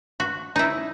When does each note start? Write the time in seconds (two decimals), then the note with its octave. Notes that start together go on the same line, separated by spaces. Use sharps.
0.20 F#4
0.56 D#4 E4